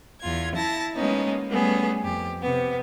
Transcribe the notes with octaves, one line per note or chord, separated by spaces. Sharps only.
E2 F4 G#6
E4 A5 A#6
G#3 A#3 B3 C#4 D#4
G3 A3 B3 C#4 G#4
F2 G4
C3 B3